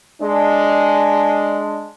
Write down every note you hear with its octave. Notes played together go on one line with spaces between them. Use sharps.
G#3 D4